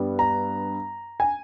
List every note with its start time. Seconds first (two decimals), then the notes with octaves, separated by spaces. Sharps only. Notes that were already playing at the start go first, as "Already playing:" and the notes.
Already playing: G2 G3 B3
0.19 A#5
1.20 G#5